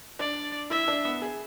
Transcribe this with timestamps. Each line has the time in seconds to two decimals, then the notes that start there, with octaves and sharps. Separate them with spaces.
0.19 D4 D5
0.70 E4 E5
0.88 D4
1.05 B3
1.22 G#4